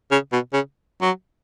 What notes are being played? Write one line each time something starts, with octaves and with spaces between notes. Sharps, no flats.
C#3
B2
C#3
F#3